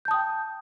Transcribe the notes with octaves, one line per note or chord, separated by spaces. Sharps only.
G5 A5 D#6 G6